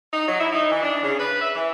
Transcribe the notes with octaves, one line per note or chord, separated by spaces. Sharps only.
D#4
F#3
E4
D#4
E3
D4
C#3
B4
E5
E3